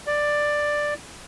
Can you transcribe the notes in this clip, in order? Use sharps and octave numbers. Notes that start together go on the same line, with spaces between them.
D5